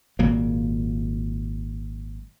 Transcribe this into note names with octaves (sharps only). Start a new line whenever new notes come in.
G#1 A#2 F#3 A#3